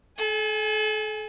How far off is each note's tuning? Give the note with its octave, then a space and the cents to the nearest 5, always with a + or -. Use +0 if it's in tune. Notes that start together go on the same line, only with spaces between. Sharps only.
A4 -40 G#5 +0